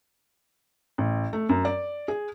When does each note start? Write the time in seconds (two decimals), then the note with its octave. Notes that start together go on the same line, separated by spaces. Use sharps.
0.98 A1
1.33 A3
1.49 F#2
1.65 D5
2.08 G#4